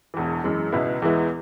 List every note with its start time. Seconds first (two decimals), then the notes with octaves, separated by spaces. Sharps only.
0.14 E1 E2 E3
0.44 F#2 E3 G#3
0.72 C#2 B2 B3 E4
1.02 E2 E3 G#3 B3 E4